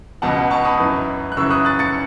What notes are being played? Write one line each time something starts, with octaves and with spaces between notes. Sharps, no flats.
C#2 B2 F#5 A5
A5 C#6
B5 D#6
F#2 E3
F#6
F#2 C#3 E3 C#6 E6
D#6 F#6
F#6 A6
A6 C#7